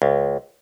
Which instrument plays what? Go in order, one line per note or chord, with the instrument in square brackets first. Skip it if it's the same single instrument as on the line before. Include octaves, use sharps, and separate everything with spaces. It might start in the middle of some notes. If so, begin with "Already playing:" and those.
[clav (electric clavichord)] C#2